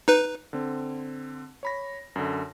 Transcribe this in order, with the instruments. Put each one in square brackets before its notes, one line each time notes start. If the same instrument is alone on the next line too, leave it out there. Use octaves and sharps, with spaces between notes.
[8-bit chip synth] D#4 B4
[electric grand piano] D3 C4
C#5 B5 A#6
F#2 D3